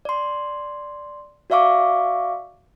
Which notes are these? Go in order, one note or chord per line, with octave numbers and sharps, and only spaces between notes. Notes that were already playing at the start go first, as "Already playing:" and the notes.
D5 C6
F#4 D5 E5 F5 C#6 D6